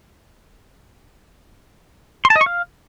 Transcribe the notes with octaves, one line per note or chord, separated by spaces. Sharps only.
C6
A5
D#5
C#6
F5